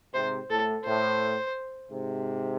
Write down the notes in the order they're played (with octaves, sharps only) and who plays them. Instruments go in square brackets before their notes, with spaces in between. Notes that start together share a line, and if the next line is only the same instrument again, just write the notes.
[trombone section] G#2 C3 [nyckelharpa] C5
[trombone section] A2 [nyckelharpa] A4
[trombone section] A2 [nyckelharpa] C5
[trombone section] G#2 C3